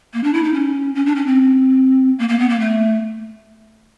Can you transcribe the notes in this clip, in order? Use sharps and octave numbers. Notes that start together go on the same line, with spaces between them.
A#3
D4
E4
D#4
C#4
C#4
D4
C#4
C4
A#3
A#3
B3
A#3
A3